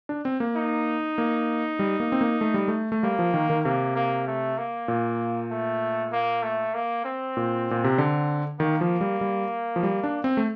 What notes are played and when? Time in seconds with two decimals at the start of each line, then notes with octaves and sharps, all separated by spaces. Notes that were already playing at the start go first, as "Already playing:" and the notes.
0.09 D4
0.25 C4
0.40 A#3
0.56 D#4
1.18 A#3
1.79 G3
2.00 A#3
2.12 C4
2.21 A#3
2.41 A3
2.54 G3
2.68 A3
2.92 A3
3.03 G3 A#3
3.19 F3
3.34 D#3
3.50 D#3
3.64 C3 A#3
3.96 A#3
4.27 A3
4.58 A#3
4.88 A#2
5.51 A3
6.12 A#3
6.43 A3
6.74 A#3
7.05 C4
7.37 A#2
7.71 A#2
7.84 C3
7.98 D3
8.60 D#3 A#3
8.81 F3
9.01 G3
9.21 G3
9.76 F3
9.83 G3
10.04 D4
10.24 C4
10.37 A3